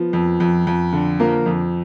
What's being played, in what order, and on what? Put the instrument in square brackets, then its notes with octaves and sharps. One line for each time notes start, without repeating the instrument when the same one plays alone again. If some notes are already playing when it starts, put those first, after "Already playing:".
Already playing: [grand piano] F3 B3
F2
F2
F2
D3
F3 A#3 A#4
F2